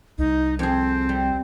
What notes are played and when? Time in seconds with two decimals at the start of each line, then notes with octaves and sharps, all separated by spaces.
0.18 C2 D#4
0.59 F2 C4 G#4
1.09 G3